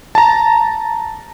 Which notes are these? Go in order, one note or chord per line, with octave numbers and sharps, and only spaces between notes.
A5 A#5